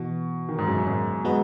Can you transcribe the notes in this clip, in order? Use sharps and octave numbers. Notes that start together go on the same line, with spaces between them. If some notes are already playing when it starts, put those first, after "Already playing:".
Already playing: B2 E3 B3 F#4
D#3
G#2
F#2
F#2
G#2
G#3 B3 F#4 B4 D#5